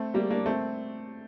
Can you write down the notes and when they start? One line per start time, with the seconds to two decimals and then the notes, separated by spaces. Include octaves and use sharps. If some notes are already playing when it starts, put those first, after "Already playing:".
Already playing: A3 C4
0.14 G3 A#3
0.31 A#3 D4
0.46 A3 C4